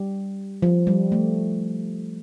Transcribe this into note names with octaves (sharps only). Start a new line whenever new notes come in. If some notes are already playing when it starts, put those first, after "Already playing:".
Already playing: G3
F3
G3
A3